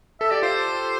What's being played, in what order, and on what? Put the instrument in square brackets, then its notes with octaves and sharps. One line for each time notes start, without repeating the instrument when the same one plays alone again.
[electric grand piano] A4 [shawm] E5
[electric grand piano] G4 [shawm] D5
[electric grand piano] F4 [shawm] C5